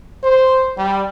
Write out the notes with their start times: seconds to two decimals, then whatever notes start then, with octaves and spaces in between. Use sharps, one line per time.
0.23 C5
0.77 G3